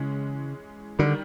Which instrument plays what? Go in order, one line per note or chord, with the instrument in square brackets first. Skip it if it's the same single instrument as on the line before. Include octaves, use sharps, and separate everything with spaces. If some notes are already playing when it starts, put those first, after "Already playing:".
Already playing: [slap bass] C#3 [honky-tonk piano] E3 G#3 C#4
[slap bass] D3 [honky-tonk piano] D#3 G3